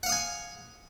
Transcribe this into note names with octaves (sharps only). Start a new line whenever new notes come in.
F5 F#5 G#5 D#6